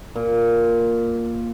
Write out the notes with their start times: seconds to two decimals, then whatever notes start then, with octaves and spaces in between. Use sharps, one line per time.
0.16 A#2